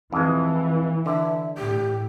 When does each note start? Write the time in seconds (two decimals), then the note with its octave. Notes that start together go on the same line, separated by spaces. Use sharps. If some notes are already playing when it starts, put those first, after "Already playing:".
0.12 F2 E3 G#3
1.06 D3 E5
1.57 A2 G4